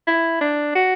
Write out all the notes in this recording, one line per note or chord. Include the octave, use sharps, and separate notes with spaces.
E4
D4
F#4